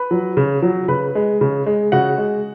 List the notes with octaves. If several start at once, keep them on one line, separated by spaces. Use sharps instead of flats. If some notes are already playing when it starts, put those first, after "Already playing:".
Already playing: B4 B5
F#3
C#3
F#3
C#3 B4 B5
G#3
C#3
G#3
C#3 F#4 F#5
G#3